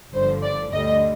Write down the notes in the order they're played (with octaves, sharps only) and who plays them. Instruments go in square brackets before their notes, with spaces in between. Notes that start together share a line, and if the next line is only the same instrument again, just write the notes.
[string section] G1 G2 D3 F3 C5
D5
D2 D3 G3 D#5